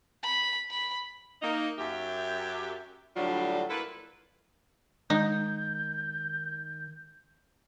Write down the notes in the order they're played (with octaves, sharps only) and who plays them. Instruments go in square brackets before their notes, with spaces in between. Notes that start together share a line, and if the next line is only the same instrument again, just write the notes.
[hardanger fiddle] B5
B5
[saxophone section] A#3 D#4
F#2 G4 E5
A2 D3 F#3 G3 D4 F4
A#3 E4 F4 A4 B4
[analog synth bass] D#3 [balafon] G#3 [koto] D#4 [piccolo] G6